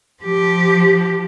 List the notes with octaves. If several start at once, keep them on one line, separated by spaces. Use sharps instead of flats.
F3 G4